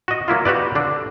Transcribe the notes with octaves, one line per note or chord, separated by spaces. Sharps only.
F#4 D#5
F#3 A#3 E4 F4
F#4 G4 B4 D5
D3 D4